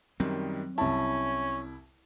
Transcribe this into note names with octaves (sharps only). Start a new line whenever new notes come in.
F#2 D#3 F#3 G3 C4
C2 C#4 E4 A5